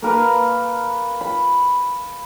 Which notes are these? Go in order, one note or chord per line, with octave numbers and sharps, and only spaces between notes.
A#3 A#4 B4
B5